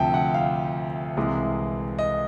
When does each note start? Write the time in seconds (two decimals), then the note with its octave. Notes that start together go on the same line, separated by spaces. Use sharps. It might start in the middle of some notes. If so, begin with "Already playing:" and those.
Already playing: D2 C3 F3 G5 A5
0.14 F#5
0.34 F5
1.17 C2 C3 E3 G#3
1.99 D#5